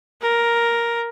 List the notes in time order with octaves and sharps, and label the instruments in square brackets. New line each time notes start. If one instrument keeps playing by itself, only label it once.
[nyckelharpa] A#4